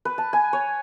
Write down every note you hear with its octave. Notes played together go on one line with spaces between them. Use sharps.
B4
A5
G#5
C#5